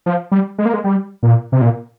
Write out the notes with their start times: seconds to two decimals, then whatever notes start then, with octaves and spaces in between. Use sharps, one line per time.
0.06 F3
0.32 G3
0.58 G#3
0.65 A#3
0.74 G#3
0.84 G3
1.23 A#2
1.52 C3
1.62 A#2